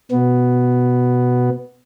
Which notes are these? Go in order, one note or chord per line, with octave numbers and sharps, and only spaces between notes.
B2 B3